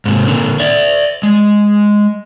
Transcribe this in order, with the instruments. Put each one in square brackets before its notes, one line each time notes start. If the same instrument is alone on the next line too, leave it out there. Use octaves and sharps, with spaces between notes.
[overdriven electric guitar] G#2 C3
A#2 D3
D5 E5
G#3